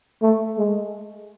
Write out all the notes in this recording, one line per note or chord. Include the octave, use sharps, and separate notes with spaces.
A3
G#3